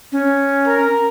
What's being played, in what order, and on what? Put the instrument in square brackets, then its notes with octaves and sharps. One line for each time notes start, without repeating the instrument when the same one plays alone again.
[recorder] C#4
[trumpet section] A#4